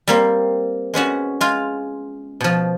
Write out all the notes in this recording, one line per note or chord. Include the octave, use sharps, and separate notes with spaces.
G3 A#3 C4
G#3 B3 C#4 F#4
G#3 F4
B2 F3